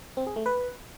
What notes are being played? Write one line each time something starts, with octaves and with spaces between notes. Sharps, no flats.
C4
G#4
A3
B4